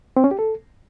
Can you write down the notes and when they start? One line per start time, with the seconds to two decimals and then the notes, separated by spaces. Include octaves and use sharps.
0.17 C4
0.24 C#4
0.31 G4
0.39 A4